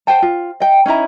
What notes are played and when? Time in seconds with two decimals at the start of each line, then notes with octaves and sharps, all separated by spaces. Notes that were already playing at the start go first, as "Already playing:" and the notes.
0.07 C5 F#5 G5 A5
0.22 F4
0.60 D#5 G5
0.86 C#4 D#4 E4 A#5